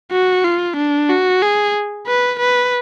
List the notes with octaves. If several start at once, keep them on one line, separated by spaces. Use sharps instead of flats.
F#4
F4
D4
F#4
G#4
B4
B4